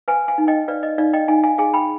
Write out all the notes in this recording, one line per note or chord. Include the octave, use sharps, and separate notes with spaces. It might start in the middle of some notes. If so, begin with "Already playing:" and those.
B4 F5 G#5
F5 G#5
D#4
D#5 G5
B4 D5 F5
D#5
D#4 D5 F5
D#5 G5
D#4 F5 G#5
F5 G#5
G#4 F5 G#5
G5 B5